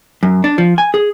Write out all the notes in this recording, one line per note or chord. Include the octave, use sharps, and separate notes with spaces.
F#2
D4
F3
G#5
G#4